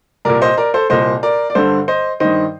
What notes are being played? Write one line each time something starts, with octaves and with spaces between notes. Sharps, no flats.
C2 A#2 A#4 D5
C5 D#5
A#4 D5
A4 C5
C2 A#2 C5 D#5
A#4 D5
D5
G2 D3 A4 C5
C5 D#5
G2 D#3 C5 D#5